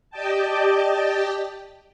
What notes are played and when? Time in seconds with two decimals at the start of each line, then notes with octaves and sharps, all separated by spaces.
0.10 G4 D5 D#5 G5 A5